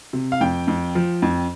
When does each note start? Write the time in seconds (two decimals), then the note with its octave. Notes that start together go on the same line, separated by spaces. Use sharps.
0.13 C3
0.32 F5
0.41 F2 G5
0.68 F2
0.95 F3
1.22 F2